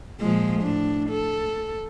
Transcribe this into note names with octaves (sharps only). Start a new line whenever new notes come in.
A#2 F3 G#3
A2 D4
A4